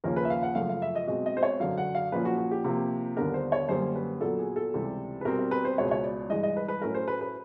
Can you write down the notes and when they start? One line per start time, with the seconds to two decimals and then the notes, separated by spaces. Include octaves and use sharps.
0.04 D#2 C#3 F3 A#3 C#4 A#4
0.16 B4
0.25 E5
0.30 F5
0.43 F#5
0.55 F#2 C#3 F3 A3 F5
0.69 F5
0.82 E5
0.95 D#5
1.07 B2 G#3 C4 D#5
1.26 D#5
1.37 C5
1.43 C#5
1.60 F#2 D3 F#3 F5
1.78 F#5
1.95 F5
2.12 A#2 F3 A#3 C#4 B4
2.25 F#4
2.38 F#4
2.51 G4
2.64 C3 F3 A#3
3.16 D#2 D3 G3 B3 D4 A#4
3.34 C5
3.52 C#5
3.69 F#2 D3 G3 A#3 C#4 C5
3.95 B4
4.21 A#2 F#3 B3 A4
4.39 G#4
4.56 A4
4.74 C#2 C3 E3 G3
5.21 B4
5.25 B2 G3 C4 A#4
5.39 A#4
5.51 B4
5.65 C5
5.78 C#2 B2 G#3 C#5
5.91 C#5
6.04 D5
6.30 G2 E3 G#3 D#5
6.43 D#5
6.57 B4
6.68 B4
6.81 A2 F#3 A3 C#4 A#4
6.95 C5
7.08 B4
7.21 B4